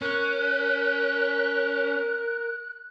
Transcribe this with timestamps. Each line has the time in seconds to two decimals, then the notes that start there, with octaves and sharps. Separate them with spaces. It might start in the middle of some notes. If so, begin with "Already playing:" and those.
0.02 C#4 A#4 F#6